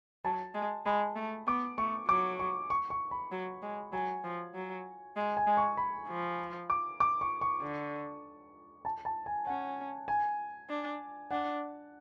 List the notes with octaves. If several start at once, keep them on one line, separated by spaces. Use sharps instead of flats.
F#3 A5
G#3
G#3 B5
A3
B3 D6
A3 C#6
F#3 D6
C#6
C#6
C#6
B5
F#3
G#3
F#3 G#5
F3
F#3
G#3
G#5
G#3
C#6
B5
F3
D6
D6
C#6
C#6
D3
A5
A5
G#5
C#4 F#5
G#5
D4
D4 F#5